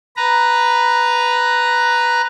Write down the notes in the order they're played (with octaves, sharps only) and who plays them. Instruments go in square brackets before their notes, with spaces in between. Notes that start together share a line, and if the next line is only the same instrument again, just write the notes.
[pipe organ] B4 A#5